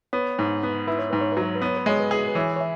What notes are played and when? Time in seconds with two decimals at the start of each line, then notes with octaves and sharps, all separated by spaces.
0.13 B3 C#5
0.39 G#2
0.63 B3
0.87 E4 B4
0.99 C#5
1.10 G#2 B4
1.21 C#5
1.32 F#3 B4
1.43 C#5
1.55 B4
1.62 B3 C#5
1.77 B4
1.86 G#3 C#5
1.99 B4
2.11 G#4
2.28 B4
2.35 E3 C#5
2.56 C#5
2.61 E5